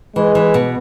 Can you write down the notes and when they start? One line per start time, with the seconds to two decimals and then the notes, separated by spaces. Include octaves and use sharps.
0.16 E3 G#3
0.35 E3
0.54 B2